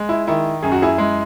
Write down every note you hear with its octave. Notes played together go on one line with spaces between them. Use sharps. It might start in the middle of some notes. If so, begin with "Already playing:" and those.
Already playing: G#3
E4
D#3 E4
F#2 G#4
F#4
E4 G#4
G#3